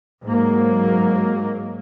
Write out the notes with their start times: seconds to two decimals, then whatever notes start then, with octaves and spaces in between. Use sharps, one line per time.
0.24 G#2 F#3 A#3